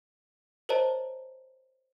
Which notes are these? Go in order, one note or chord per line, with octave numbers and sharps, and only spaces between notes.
A#4 C5 C#5 D#5 A5 A#5